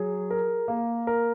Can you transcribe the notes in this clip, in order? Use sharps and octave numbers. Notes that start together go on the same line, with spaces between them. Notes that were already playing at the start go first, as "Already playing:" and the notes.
Already playing: F#3 G#4
A#4
A#3
A#4